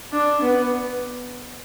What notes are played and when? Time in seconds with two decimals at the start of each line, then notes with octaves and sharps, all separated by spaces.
0.13 D4
0.42 B3